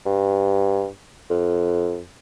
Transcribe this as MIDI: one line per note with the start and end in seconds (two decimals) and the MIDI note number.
0.06 0.88 43
1.30 2.02 41